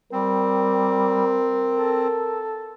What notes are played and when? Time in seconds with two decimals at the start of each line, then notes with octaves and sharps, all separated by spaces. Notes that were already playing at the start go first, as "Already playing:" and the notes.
0.12 G3 C4 A#4
1.77 A4